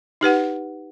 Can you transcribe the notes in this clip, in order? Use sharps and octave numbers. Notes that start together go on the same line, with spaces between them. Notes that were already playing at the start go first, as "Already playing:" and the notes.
D#4 G4 B4 F#5